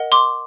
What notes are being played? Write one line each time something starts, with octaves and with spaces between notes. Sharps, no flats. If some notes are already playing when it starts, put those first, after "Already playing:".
Already playing: A#4 D#5 F#5
C6 D6